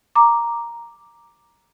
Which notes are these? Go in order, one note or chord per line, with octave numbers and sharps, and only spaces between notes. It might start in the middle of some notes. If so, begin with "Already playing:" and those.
A#5 D6